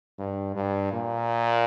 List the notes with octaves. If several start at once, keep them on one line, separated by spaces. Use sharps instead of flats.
G2
G2
A#2